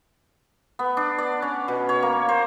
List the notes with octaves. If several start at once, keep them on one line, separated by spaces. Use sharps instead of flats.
B3
D4
D5
C#4
B2
C#5
A#3
C5